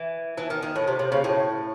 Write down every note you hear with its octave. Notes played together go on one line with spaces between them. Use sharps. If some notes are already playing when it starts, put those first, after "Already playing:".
Already playing: E3
E3
D#3
D#3
A2
C3
C3
C#3
A2